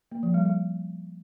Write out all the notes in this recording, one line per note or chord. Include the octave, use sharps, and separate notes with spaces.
A#3
F3
G3
G3